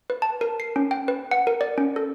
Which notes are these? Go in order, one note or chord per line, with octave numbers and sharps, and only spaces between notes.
B4
A5
A#4
C7
C#4
G5
B4
F#5
A#4
D5
C#4
A4